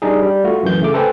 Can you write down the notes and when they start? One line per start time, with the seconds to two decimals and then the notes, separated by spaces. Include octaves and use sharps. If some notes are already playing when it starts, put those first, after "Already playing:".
0.02 G3 D4 D#4 G#4
0.22 G3
0.44 A3 F4 F#4
0.63 F#2 E3 G6
0.81 C#3 A3 D6
0.94 A4 B4 C5 G5 G#5